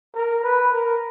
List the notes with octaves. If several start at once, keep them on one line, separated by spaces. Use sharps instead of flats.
A#4
B4
A#4